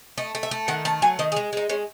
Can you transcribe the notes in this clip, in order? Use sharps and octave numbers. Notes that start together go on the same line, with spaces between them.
A3 D#5
A3
E5
A3
D#3 F#5
A3 A5
F#3 G#5
D#3 D#5
G#4
G#3
G#3 D#4
G#3 C#4